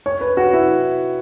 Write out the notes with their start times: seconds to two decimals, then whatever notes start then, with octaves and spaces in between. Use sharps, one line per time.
0.06 C#5
0.21 B4
0.37 F#4
0.53 E4